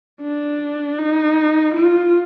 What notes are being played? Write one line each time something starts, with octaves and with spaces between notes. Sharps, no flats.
D4
D#4
F4